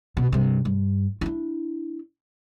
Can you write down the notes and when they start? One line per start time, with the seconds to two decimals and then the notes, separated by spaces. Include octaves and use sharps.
0.17 B2
0.32 G2 C3
0.65 G2
1.21 D4 E4